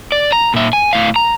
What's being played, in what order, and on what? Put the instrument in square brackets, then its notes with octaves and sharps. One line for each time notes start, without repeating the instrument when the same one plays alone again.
[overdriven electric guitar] D5
A#5
A#2 E5
G#5
A2 F5
A#5